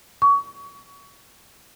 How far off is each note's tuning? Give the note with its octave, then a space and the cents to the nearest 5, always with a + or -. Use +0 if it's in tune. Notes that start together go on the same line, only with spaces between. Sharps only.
C#6 +30